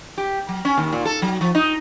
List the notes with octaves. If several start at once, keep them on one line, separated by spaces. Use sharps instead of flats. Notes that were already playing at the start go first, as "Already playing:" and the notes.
G4
F#3
C#4
D#2
A#2
A4
F#3
F3
D#4